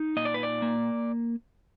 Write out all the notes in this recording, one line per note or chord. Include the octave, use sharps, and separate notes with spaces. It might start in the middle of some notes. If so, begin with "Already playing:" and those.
Already playing: D#4
A#2 D#5
D5
B4
D5
A#3